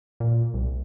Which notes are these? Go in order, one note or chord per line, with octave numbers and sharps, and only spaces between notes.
A#2
C2